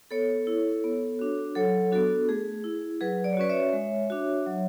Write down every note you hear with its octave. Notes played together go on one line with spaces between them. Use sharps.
B3 A4 C#5
E4
B3
D4 F#4
F#3 A4 C#5
B3 D4 F#4 A4
A3 G#4
E4
F#3 G#4 B4
D5
C#5
C#4 F#4 B4 D5
C#5 E5
G#3
D4 F#4
F#3